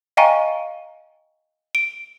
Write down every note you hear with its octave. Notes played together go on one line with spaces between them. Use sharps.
D#5 F5 G5 G#5 A#5 C#6
D7